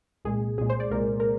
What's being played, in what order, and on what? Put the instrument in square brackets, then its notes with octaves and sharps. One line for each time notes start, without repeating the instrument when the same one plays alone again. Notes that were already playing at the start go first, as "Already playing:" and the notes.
[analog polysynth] C2 A#2 G#3 G#4
C2 A#2 G#3 G#4
C5
D5
C2 A#2 G#3 A#4
A#4